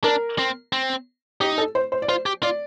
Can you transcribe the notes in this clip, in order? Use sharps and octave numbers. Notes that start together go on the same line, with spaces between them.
D4 A#4
C4
C4
D#4 G4
A4
C5
C5
D5
F4 C5
G4
F4 D5